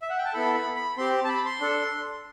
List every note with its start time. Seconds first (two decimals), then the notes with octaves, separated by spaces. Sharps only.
0.02 E5
0.10 F#5
0.18 G5
0.25 A5
0.33 B3 E4 A4 B5
0.54 B5
0.76 B5
0.98 C4 G4 C6
1.24 A5
1.29 B5
1.45 C6
1.61 D4 A4